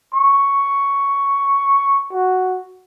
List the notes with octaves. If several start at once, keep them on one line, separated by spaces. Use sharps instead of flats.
C#6
F#4